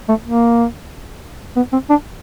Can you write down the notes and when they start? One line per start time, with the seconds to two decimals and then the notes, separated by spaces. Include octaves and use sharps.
0.09 A3
0.25 A#3
1.56 B3
1.73 C4
1.90 D4